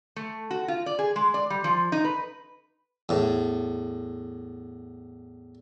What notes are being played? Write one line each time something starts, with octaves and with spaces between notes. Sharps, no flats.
A3
F#4
F4
D5
G#4
G#3
D5
G3
F3
D#4
B4
E2 A2